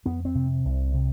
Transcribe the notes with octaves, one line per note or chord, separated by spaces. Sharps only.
F2 B3
C4
C3
C2
C3